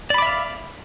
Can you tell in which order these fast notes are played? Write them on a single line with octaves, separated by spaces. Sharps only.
D5 B5 D6 E5 F5